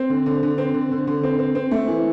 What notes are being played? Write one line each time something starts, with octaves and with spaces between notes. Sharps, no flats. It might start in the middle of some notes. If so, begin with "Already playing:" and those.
Already playing: C4
D3
D3
D3
C4
D3
D3
D3
C4
C4
C4
A3
E3